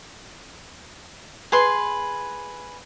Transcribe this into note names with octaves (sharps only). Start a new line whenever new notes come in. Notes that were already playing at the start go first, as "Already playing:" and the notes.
G#4 B4 C6